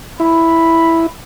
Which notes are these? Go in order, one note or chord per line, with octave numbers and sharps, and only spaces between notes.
E4 B5